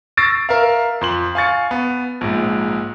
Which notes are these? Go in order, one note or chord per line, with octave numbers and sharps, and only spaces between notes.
C#6 E6 A6 A#6 C7 D7
A#4 E5 F5
F2 C6 F#7
F5 G#5 C#6 A6 C#7
B3
A#1 G#2